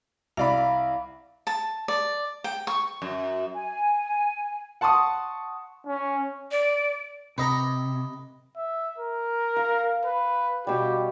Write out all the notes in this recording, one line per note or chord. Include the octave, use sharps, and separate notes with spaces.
C2 D5 F5 B5
A5
D5
G5
C#6
F#2
G#5
F#5 A5 C6 C#6 D#6
C#4
D5
C3 B4 D#5 A#5
E5
A#4
F5
B4
B2 G3 G4